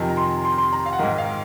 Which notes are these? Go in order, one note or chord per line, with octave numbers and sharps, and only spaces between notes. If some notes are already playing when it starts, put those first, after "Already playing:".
Already playing: F2 C3 D#3 G#5
A#5
C6
C6
C6
A#5
F5
F#5
G#2 D#3 F5
F5